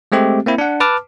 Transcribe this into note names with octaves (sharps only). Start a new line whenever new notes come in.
G#3 A3 C4 G4
A#3 C4 E4
D4 F#5
B4 A5 D6 F6